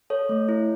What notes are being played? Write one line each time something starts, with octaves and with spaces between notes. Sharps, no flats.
A4 C#5
A3
E4